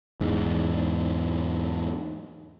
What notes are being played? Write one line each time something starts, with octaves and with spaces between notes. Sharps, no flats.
E2 G#2